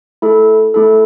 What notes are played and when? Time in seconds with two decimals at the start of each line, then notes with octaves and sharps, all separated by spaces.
0.22 A3 E4 A4
0.74 A3 E4 A4